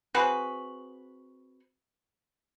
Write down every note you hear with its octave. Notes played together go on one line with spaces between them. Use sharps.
C4 F#4 G#4 B4